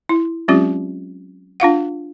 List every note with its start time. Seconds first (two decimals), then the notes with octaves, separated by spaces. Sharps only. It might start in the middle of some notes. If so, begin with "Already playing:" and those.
0.09 E4
0.48 F#3 G#3 C4 C#4 F4 G4
1.60 D4 F4 F5 F#5